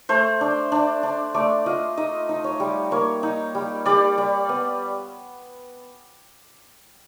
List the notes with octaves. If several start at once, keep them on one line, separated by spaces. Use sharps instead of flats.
A3 C5
D4
D4
D4
A3 D5
F4 D#5
D#4 D#5
D#4
C#5
G3
A#3 C#5
D#4
G3
G3 D5
G3
B3